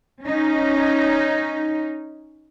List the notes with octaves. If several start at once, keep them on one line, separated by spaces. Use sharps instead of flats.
C#4 D#4